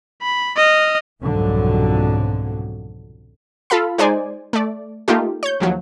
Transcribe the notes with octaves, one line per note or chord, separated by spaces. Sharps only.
B5
D#5 F6
C2 F2 G#2 B2 D3 F#3
F4 A4 F5 B5
G#3 D#4 C5 D5 G#5
A3 D5
A3 A#3 D#4 F4 G4
C#5 G6
D#2 F3 F#3